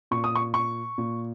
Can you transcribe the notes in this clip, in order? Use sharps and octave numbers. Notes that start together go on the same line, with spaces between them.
A#2 C#6
D#6
C#6
C#6
A#2